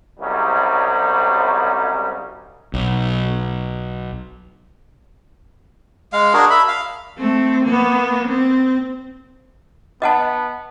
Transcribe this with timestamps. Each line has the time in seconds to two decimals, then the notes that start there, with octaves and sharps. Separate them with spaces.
0.20 C2 G#2 C#3 F#3 G3
2.74 B1
6.13 G#3 F5
6.34 D4 F#4 G#4 A#4
6.50 E5 B5
6.68 F5
7.18 A3 C4
7.65 A#3 B3
8.28 C4
10.02 B3 D#5 F#5 A5